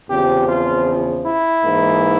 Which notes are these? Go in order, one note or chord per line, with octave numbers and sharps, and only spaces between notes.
E2 C#3 F3 C4 G4
F4
E4
G#2 E3 A#3